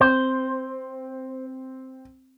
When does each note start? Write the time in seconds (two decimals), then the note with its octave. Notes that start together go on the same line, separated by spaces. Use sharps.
0.01 C4 C5